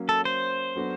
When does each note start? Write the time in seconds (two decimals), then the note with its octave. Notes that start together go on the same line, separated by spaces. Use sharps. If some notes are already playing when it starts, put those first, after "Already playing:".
Already playing: F#3 A#3 C#4
0.09 A4
0.25 C5
0.76 F#3 B3 D4 F#4 A4